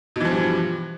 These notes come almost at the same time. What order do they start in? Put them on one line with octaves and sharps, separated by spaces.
B2 E3 F3 G2